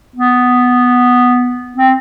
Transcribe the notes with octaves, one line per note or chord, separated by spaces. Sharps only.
B3
C4